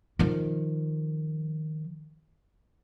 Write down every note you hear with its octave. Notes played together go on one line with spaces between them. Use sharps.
D#3 F3